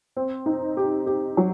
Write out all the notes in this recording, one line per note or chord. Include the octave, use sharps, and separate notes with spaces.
C4
D#4
G4
G4
F#3